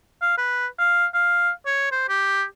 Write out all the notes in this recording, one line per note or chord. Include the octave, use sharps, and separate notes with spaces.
F5
B4
F5
F5
C#5
C5
G4